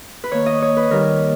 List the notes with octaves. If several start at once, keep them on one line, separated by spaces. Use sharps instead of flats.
B4
D#3 A#3 C#5
D#5
C#5
B4
D#3 G3 A#3 A#4